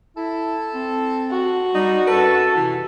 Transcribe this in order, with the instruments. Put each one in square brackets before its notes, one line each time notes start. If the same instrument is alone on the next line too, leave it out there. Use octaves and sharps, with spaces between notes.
[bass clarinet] E4 [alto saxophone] A4
[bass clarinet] C4
[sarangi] F#4
[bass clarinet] G3 [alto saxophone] D#4
[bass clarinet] F#2 [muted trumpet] A4 [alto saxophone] B4
[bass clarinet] C3 [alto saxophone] E3